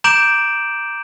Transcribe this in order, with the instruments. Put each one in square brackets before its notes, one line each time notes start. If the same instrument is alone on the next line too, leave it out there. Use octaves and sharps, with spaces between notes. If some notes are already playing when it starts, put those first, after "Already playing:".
[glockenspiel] A#5 D6 G6 D7 E7 F#7